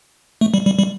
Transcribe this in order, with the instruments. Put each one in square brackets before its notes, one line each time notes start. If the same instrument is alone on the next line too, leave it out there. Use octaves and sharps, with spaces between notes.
[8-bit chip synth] A3
G3
G3
G3